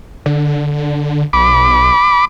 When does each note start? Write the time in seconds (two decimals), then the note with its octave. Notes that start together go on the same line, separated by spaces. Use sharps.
0.26 D3
1.33 B1 B5 D6